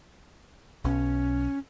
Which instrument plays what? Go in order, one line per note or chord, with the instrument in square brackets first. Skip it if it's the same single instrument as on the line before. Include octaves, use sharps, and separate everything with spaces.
[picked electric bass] B1 [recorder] C#4